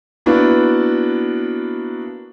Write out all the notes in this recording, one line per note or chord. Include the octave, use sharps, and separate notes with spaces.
A#3 B3 D4 E4 F#4